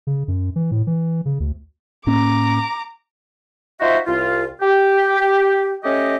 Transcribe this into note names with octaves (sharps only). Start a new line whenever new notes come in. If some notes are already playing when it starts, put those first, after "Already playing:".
C#3
F#2
E3
A2
E3
C#3
D2
A2 A#3 C#4 A#5 D6
D#4 F4 F#4 C5 E5
C2 F4
G4
A3 C#4 G4 D#5